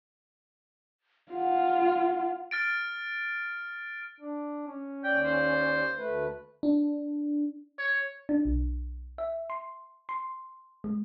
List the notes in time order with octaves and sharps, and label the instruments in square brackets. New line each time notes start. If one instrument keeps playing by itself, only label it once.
[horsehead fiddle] F4 [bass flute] F#5
[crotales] F6 A6 D7
[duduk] D4
C#4
[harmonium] D#2 D5 [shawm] G5
[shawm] C5
[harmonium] D2 A3 B4
[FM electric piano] D4
[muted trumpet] C#5
[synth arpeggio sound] D4
B1
E5
C6
C6
G#3